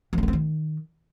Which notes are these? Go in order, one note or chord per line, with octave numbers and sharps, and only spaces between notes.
E3
C4
B3
C4
D#3